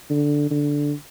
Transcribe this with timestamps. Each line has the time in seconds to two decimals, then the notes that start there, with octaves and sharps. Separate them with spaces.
0.10 D3
0.51 D3